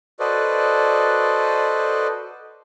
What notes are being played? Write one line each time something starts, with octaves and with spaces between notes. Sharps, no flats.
F#4 A4 B4 C5 D5 D#5